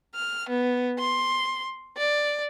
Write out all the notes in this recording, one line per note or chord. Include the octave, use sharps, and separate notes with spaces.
F6
B3
C6
D5